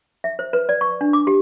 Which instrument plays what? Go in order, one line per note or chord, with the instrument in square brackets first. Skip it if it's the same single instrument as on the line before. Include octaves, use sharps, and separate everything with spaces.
[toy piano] E5
C5
B4
D5
C#6
D4
D6
G4